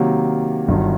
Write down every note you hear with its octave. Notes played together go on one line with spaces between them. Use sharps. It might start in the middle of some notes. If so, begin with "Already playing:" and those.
Already playing: C3 D#3 F#3 A#3
G1 G2 D#3 F#3